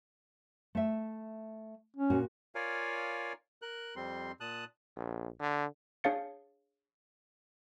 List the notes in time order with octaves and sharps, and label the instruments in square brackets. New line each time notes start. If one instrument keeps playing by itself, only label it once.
[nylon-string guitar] A3 E5
[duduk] C#4
[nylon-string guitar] A#2 F#4
[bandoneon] F4 A#4 C#5 D5 F5 G#5
A#4 F#6
F2 G3 C4 C6
A#2 A5 D#6 F#6
[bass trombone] A#1
D3
[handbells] D4 G#4 C#5 F5 A6 C#7